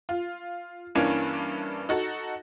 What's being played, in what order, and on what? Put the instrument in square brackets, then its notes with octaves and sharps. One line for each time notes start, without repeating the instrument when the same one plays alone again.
[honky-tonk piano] F4
G2 E3 A#3 C#4 D4
D#4 F#4 A4